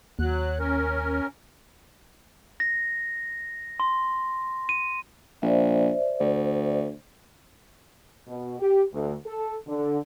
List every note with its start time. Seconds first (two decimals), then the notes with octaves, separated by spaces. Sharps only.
0.19 D#2 F#3 F#6
0.59 C#4 A#4
2.60 A#6
3.80 C6
4.69 D#7
5.42 A#1 C5 D5 E5
6.20 D2
8.28 B2
8.59 G4
8.93 D2
9.26 A4
9.68 D3